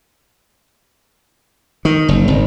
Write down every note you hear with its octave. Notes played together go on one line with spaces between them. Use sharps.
D#3
F#1
G#1